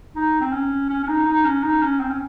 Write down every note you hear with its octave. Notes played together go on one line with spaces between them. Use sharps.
D#4
C4
C#4
C#4
C#4
D#4
D#4
C#4
D#4
C#4
C4
C#4